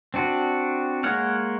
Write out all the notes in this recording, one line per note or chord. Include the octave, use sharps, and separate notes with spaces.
C4 D4 F#4
G#3 A#3 C#5 F#5 F6